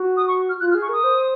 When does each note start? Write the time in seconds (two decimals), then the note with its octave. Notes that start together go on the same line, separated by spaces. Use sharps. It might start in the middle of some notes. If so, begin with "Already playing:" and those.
Already playing: F#4
0.17 D#6
0.28 C#6
0.49 F6
0.60 F4 F#6
0.71 F6
0.75 G#4
0.82 C#6
0.89 A#4 D#6
1.04 C5